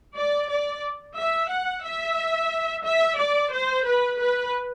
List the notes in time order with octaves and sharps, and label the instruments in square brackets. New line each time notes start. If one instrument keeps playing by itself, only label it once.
[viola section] D5
D5
E5
F#5
E5
E5
D5
C5
B4
B4